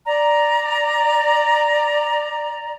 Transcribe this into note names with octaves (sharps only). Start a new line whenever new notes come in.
D5 A#5